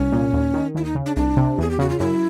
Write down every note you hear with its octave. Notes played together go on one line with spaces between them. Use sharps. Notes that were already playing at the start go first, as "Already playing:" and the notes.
Already playing: C2 C#4
A#2
D#2
D#3
D#2 E4
D#4
C#3
D4
C2 D4
C3
E2 G#4
G4
C#3 F#4
F4
F#2 E4